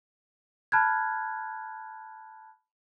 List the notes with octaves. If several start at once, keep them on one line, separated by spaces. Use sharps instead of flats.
A5 B5 F6 F#6 G#6